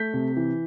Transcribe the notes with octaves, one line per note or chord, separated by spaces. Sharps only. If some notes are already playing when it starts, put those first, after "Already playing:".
Already playing: A3 G6 B6
C3
E3